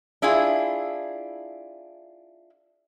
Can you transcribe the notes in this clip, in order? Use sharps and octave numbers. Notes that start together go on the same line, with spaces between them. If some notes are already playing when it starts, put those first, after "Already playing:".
D4 E4 F4 G#4